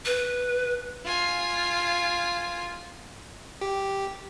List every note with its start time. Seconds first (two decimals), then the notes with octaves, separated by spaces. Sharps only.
0.06 B4
1.05 F4 G#5
3.61 G4